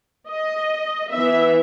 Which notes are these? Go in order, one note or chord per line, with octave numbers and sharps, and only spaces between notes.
D#5
E3 B3 E5